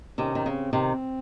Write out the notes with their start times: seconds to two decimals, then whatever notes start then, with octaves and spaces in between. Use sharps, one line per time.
0.18 C3 D#3 C#4
0.35 D#3
0.46 C#3 C4
0.73 C3 D#3 C4